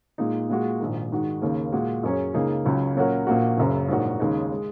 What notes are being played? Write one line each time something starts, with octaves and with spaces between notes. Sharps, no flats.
A#2 G#3 D#4
A#2 G#3 F#4
A#1 G#2 D#3
G#2 D#3 G#3 F#4
D#2 C#3 A#3
A#2 G#3 F#4
F#2 F#3 C#4 G#4 C#5
C#2 C#3 A#3 D#4 G#4
C#2 C#3 F#3 C#4
A#2 F#3 C#4 F#4 A#4
A#1 A#2 A#3 F#4
F#1 F#2 C#3 F#3
A#1 G#2 F#3 A#3 F#4
D#2 C#3 G#3 D#4
G#3